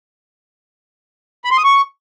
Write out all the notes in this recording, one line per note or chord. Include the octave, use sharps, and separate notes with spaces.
B5
C6
D#6
C#6